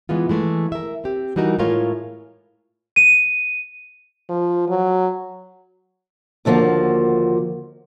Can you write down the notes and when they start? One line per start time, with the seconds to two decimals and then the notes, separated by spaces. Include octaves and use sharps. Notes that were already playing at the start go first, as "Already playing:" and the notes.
0.09 E3 G#3 B3 F4
0.29 E3 G#3 A3
0.72 A#4 E5
1.04 C4 G4
1.36 E3 G3 D#4 F#4 A#4
1.59 A2 G#3 A3 F4 A#4 C#5
2.96 D#7
4.29 F3
4.69 F#3
6.45 D#2 D3 F3 A#3 F#4